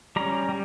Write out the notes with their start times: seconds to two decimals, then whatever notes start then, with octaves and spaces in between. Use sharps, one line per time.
0.16 G3 C#4 A#5
0.49 G3